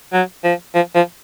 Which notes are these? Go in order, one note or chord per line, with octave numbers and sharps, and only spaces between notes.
F#3
F3
F3
F3